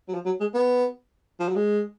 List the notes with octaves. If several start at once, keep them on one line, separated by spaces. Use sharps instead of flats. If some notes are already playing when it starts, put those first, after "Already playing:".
F#3
F3
F#3
G#3
B3
F3
F#3
G#3